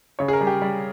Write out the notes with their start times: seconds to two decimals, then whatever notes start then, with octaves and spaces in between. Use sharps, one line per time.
0.19 C#3 C#5
0.28 G#4
0.33 A#4
0.41 G3
0.47 G4
0.62 G3